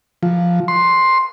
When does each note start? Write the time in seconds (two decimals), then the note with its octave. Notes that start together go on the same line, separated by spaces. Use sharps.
0.23 F3
0.68 C6